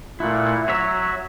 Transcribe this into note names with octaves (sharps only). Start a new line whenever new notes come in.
A#2 A3 E4 F#5
F#3 F#4 C#5 E5